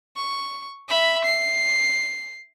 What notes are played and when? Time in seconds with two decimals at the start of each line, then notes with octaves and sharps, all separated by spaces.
0.16 C#6
0.88 E5 B5
1.25 C7